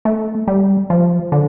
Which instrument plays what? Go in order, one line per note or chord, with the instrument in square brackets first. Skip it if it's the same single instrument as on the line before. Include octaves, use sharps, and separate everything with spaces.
[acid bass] A3
G3
F3
D3